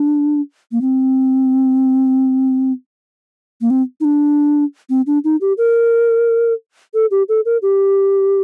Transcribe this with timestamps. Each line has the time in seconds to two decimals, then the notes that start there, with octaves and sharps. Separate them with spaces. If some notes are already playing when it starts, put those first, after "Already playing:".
Already playing: D4
0.72 A#3
0.81 C4
3.61 A#3
3.70 C4
4.01 D#4
4.05 D4
4.90 C4
5.07 D4
5.24 D#4
5.41 G4
5.58 A#4
6.94 A4
7.11 G4
7.29 A4
7.45 A#4
7.62 G4